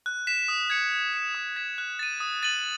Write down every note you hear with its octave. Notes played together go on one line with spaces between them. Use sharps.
F#6
B6 E7
D#6
G#6 C#7
G#6
C#7 E7
D#6
G#6 B6 E7
F#6
A6 D#7
D#6
A6 D#7 F#7